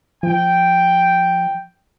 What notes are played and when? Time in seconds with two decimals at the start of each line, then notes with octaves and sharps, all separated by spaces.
0.23 F3 G5